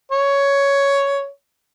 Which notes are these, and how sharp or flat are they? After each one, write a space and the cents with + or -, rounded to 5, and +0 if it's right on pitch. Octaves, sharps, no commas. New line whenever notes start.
C#5 +10